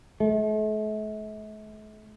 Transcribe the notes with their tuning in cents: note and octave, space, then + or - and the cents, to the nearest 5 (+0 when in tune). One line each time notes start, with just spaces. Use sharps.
A3 -45